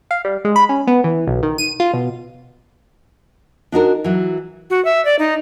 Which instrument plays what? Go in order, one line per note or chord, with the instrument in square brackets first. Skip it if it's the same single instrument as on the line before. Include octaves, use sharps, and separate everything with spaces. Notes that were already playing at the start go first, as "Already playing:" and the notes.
[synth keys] F5
G3
G#3
B5
C#4
B3
E3
B1
D#3
D#7
F4
B2
[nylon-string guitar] D4 D#4 F#4 A#4
E3 F#3
[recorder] F#4
E5
D5
D#4